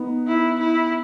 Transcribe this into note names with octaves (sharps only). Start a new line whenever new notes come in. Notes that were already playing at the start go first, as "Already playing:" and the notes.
Already playing: B3 D#4
E4
E4